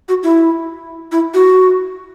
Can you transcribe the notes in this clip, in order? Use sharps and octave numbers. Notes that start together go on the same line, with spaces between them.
F#4
E4
E4
F#4